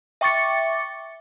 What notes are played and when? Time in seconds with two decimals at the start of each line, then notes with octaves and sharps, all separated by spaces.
0.21 E5 G5 C#6 D6 A6 C#7